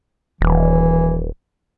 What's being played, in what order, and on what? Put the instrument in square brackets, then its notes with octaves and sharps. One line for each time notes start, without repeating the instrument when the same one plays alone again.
[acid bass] D#1 [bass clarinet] E3